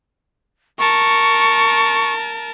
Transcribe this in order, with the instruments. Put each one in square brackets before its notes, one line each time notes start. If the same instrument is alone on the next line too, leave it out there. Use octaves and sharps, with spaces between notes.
[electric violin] A#4 A5 [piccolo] C#6